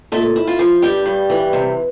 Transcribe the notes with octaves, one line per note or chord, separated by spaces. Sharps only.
A#2 A3 A4
E4
F4
F3
G2 G3 G4
G2
E3
C3